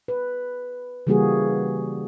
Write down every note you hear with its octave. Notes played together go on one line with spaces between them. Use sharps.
B4
C#3 E3 G3 A#3 F#4 G#4